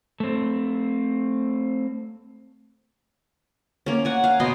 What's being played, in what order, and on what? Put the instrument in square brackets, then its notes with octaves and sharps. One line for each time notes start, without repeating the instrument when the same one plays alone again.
[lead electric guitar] A3 C4
[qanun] A#3 C#4
F#5 G#5
F5
B2 B3 D#5 C6